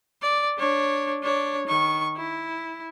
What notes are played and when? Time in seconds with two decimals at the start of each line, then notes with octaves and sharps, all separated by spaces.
0.22 D5
0.58 D4 C#5
1.23 D4 C#5
1.67 D#3 C#6
2.17 E4